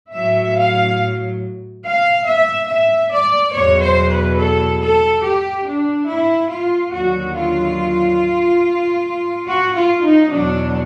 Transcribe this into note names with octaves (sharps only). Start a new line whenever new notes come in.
A2 F#3 E5
F5
F5
E5
E5
D5
E2 B2 F#3 C#5
C5
B4
A4
A4
G4
D4
E4
F4
D#2 D3 F#3 F#4
F4
F#4
F4
D#4
E2 B2 F#3 D4